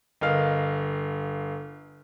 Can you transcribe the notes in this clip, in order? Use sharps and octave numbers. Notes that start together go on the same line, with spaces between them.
G1 A#4 D#5 F5 F6